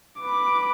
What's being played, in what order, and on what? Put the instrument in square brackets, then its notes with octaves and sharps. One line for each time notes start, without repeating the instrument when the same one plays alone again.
[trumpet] B4 [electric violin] D6